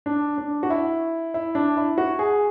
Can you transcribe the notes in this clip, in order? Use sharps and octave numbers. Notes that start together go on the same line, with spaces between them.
D4
D4
F#4
E4
E4
D4
E4
F#4
G#4